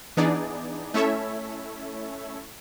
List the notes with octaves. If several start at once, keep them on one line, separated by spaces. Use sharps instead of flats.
E3 B3 D4 D#4 G#4 D5
A3 C#4 E4 A4 C#5 E5